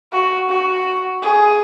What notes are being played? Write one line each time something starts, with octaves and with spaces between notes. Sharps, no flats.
F#4
F#4
G#4